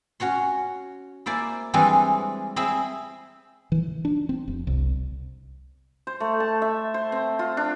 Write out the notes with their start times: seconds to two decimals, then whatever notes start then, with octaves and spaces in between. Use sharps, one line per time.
0.20 C#4 F#4 C#5 C6
1.26 A#3 E4 C5 D5 G#5
1.74 E3 G3 G#3 C4 D4 G#4
2.56 C4 E4 G#4 E5 G#5 B5
3.72 E3
4.05 D4
4.29 C4
4.48 F1
4.67 C2
6.07 C5
6.20 A3
6.40 A5
6.62 E5
6.94 C5
7.12 C4
7.39 F4
7.57 D4